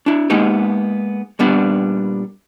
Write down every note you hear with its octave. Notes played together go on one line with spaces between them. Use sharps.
D4 E4
G#3 A#3 B3 D#4 G4
A#2 G3 B3 D4